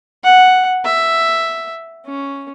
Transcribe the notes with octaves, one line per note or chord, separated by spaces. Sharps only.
F#5
E5
C#4